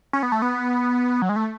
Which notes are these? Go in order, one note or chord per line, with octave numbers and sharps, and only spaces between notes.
C#4
B3
A3
B3
F#3
G#3
A3